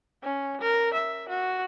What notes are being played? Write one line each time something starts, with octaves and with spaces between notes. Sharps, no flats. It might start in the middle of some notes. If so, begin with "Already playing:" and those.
C#4
A#4
E5
F#4